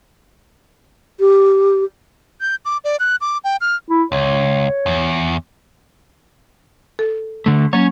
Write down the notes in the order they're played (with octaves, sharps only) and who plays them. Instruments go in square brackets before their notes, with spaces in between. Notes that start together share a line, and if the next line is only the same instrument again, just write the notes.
[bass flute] G4
[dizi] G6
D6
D5
F#6
D6
G5
F6
[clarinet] E4
[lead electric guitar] C#2 [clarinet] C#5
[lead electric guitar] E2
[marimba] A4
[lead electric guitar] D3 A3
[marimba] F#3 A#3 [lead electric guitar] C#4 C#5